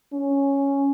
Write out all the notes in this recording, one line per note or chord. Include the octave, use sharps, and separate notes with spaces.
C#4